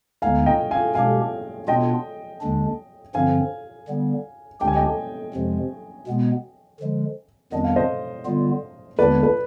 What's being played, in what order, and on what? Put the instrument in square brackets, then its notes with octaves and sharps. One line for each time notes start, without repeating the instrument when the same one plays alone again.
[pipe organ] D2 D3 G#3 B3 D#4 [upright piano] F5 G#5
[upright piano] D#5 G5
F5 G#5
[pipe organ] B2 G#3 D4 G4 [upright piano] F5 G#5
[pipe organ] B2 B3 D4 F4 [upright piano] D#5 G5
[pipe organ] D#2 D3 G#3 D4
[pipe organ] G2 D3 F3 C4 [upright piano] F5 G#5
[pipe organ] D3 G3 B3
[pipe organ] D2 D3 G#3 D4 G4 [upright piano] G5
[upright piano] G#5
D#5 G5
[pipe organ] F2 C3 F3 G#3
B2 G#3 B3
D3 F3 G#3
[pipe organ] F2 D#3 G3 B3 D4 [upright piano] D#5
[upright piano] F5
C5 D#5
[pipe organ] D3 G3 B3 F4
[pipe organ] D#2 D3 G#3 B3 D4 [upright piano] B4 D5
[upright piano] B4